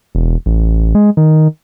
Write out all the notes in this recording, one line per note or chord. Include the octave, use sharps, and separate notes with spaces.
E1
A1
G#3
D#3